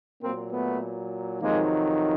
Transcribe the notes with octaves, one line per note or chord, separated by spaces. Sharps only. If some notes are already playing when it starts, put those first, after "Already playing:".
A#2 F#3 A#3 C4
A3 B3
F2 C3 D#3 F#3 G#3 A#3